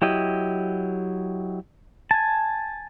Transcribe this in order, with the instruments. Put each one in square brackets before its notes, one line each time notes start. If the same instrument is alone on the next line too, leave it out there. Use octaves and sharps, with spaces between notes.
[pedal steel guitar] F#3 E4 G4 D#5
G#5 A5